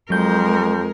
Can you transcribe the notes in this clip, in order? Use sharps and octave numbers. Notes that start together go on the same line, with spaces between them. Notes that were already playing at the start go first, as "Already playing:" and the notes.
F2 F#3 G#3 A#4 G6